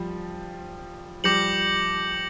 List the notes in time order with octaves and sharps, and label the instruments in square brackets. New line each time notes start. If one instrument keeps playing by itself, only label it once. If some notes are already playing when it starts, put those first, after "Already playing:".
Already playing: [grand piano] F3 G3
[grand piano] F3 G3 [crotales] D6 G6 A#6 C#7 F#7